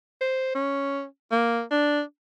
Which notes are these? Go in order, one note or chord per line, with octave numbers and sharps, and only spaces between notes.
C5
C#4
A#3
D4